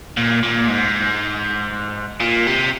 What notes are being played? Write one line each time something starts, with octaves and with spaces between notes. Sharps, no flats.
A#2
A#2
G#2
A#2
C3